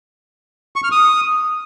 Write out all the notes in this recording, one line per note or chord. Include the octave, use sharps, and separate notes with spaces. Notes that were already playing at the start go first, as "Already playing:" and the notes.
C#6
F6
D#6